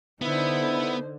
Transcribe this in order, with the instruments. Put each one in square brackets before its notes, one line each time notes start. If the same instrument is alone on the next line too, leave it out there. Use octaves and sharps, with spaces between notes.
[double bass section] D3 [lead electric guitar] B3 [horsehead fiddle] D#4 C5 [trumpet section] E4